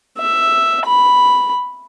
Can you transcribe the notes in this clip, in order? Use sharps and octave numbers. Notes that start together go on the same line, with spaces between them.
E5
B5